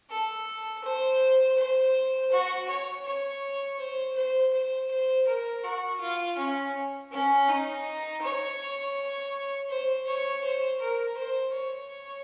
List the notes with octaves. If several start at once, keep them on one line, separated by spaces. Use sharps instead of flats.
A4
C5
C5
F#4
C#5
C#5
C5
C5
C5
C5
A#4
F#4
F4
C#4
C#4
D#4
C#5
C5
C#5
C5
A#4
C5
C#5